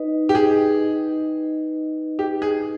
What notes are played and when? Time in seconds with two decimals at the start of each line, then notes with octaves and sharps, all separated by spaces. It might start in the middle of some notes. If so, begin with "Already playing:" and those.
Already playing: D#4 B4 D#5
0.29 G4
0.35 G#4
2.19 G4
2.42 G#4